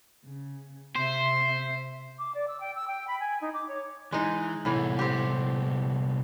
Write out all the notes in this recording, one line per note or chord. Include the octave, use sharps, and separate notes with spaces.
C#3
C3 C5 E5
D6
D5
E6
G5
E6
G5
B5
G#5
D#4
D6
C#5
E3 G#3 D#4
C2 A2 E3 B3
C4 G4